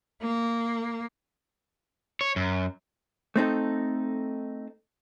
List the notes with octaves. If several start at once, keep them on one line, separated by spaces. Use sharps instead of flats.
A#3
C#5
F#2
A3 C4 D#4 A4